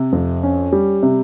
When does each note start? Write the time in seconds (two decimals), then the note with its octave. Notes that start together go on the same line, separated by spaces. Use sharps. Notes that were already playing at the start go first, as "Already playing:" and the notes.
Already playing: C3
0.12 F2
0.43 C#4
0.73 G3
1.03 C3